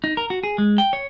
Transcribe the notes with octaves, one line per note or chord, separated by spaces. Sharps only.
D#4
A#4
F#4
G#4
G#3
G5
C#5